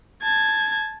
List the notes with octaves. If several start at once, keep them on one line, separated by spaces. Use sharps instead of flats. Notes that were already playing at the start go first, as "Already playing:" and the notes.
A5 G#6